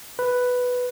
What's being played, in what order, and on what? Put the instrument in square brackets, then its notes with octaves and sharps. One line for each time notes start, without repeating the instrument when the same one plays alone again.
[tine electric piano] B4